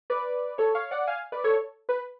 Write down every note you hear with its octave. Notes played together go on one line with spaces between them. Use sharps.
B4 D5
A4 C#5
C#5 F5
D5 F#5
F5 G#5
B4 D5
A4 C#5
B4